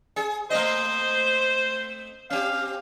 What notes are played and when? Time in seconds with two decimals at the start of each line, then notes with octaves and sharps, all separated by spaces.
0.16 G#4
0.50 A3 C4 C5 D#5
2.30 C4 G4 F5